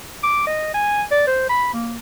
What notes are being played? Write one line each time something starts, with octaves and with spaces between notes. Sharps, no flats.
D6
D#5
G#5
D5
C5
B5
A#3